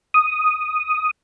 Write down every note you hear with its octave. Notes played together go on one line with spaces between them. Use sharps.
D#6